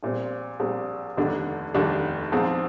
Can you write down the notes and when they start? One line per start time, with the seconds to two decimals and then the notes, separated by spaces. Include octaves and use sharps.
0.03 A#1 A#2 G3 C4
0.60 A#1 A#2 G3 C4
1.17 F1 D#2 D3 G3 D4
1.74 F1 D#2 D3 G3 D4
2.32 A#1 G#2 F3 C4